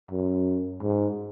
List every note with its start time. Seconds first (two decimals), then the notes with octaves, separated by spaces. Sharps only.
0.11 F#2
0.83 G#2